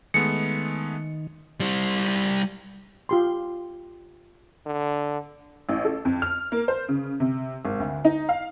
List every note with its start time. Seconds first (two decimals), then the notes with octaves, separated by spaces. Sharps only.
0.14 D#3 G#3 A3 B3 C#7
1.60 G3 C5
3.09 F4 G4 C6
4.66 D3
5.69 A1
5.85 A4
6.05 F2
6.22 F6
6.52 A#3
6.68 C5
6.89 C#3
7.20 C3
7.65 G#1
7.80 D2
8.05 D#4
8.29 F5